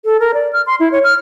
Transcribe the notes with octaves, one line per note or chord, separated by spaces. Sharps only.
A4
A#4
D5
F6
C6
E4
C#5
F6